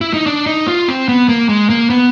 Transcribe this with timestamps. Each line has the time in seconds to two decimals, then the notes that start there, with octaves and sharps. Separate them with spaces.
0.01 E4
0.14 D#4
0.26 D4
0.46 D#4
0.68 F4
0.88 C4
1.08 B3
1.29 A#3
1.49 G#3
1.70 A#3
1.90 B3